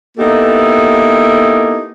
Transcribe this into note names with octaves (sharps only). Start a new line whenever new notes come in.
A#3 B3 D#4 E4 G4 A4